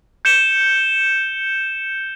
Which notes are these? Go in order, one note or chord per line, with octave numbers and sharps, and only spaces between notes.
G6 C#7 E7 G7